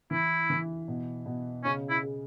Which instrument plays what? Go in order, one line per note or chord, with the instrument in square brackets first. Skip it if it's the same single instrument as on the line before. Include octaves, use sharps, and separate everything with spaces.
[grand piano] E3 [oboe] E4
[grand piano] E3
B2
B2
[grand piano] C#3 [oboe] C#4
[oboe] E4
[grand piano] G#4